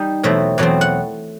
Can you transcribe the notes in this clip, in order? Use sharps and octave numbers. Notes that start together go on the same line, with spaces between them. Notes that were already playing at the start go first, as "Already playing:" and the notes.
Already playing: G3 D#4
E2 B2 F#3 A3 C4 E5
E2 B2 F#3 A3 C4
F#5